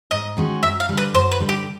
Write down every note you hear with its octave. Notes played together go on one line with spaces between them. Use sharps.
G#2 D#5
D#3 G#3 C#4 F#4
F#2 E5
F5
D3 G3
B4
F#2 C5
B4
D3 G3
G4